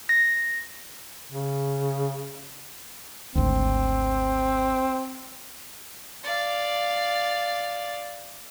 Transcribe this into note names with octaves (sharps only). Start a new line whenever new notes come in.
A#6
C#3
G#1 D2 C4
D5 F5